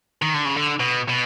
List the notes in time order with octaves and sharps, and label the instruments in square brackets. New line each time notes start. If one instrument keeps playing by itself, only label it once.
[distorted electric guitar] D#3
D3
C#3
D3
B2
B2